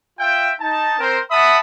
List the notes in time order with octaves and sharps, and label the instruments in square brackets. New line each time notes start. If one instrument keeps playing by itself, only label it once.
[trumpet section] F4 E5 G5
D#4 A5
C4 A#4 C5
E5 F#5 A5 B5 D#6